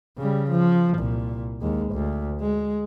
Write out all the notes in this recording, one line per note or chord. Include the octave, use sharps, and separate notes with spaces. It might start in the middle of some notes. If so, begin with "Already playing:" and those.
C#3 G3
F3
C2 A#2
D#2 G#3
D2
G#3